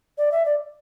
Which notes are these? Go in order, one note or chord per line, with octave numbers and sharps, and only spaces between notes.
D5
E5
D5